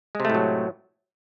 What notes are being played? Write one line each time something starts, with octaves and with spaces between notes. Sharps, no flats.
A2 C3 F#3 G#3 A3